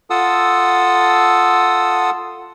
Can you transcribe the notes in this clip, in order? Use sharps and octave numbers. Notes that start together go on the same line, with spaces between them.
F4 A4 F#5 A5 D#6 E6